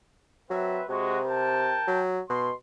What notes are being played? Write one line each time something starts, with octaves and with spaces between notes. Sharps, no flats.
F#3 C4 B4 E5
C3 G#3 F#4
A#4 G5 A5
F#3
B2 C6